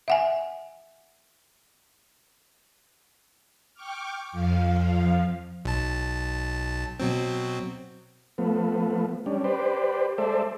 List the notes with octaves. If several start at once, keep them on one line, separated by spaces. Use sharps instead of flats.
E5 F#5 G#5
G5 C#6 D6 F6
F2 F3 F5
B1 A5
B2 F#3 C4
F3 A3 B3
G3 C#4 D4
G4 B4 C5 D5
G#3 A4 C5 D5 E5